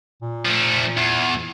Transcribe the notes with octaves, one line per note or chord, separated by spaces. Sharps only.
A#2
F3 A3
E2